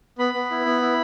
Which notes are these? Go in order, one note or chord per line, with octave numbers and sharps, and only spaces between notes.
B3 B5
B3
E4
B3
E4